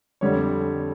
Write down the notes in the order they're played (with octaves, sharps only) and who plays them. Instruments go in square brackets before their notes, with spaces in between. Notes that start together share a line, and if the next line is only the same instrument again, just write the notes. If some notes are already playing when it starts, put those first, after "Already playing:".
[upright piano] F2 D3 G3 C#5